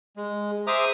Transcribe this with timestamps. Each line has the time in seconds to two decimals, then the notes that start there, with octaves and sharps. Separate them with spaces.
0.17 G#3
0.67 G#4 C5 E5 A#5 D6 D#6